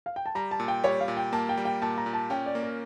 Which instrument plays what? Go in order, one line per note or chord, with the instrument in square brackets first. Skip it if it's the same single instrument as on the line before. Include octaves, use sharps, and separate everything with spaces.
[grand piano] F5
G5
A5
[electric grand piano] G3 [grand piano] A#5
[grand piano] A5
[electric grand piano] A#2
[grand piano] G5
[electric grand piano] G3 [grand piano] C#5
[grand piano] F5
[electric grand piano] A#2
[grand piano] G5
[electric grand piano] A#3 [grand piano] A5
[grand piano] G5
[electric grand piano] G3
[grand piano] G5
[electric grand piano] A#2 [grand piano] A5
[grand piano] A#5
[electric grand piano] A#2
[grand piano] A5
[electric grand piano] C#4 [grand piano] G5
[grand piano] D5
[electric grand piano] A#3
[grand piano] A#4